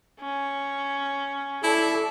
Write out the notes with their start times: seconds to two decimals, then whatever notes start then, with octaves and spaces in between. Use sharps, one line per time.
0.20 C#4
1.63 E4 A4 D5